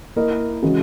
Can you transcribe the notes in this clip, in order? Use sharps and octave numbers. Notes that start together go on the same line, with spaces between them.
A#3 E4 A#4 D#5
C#3 E3 G#3 C#4 F#4